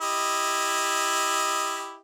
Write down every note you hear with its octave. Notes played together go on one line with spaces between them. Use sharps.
E4 G4 D#5